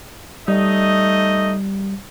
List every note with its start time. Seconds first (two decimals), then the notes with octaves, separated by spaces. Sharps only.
0.48 G3 A3 D#4 D#5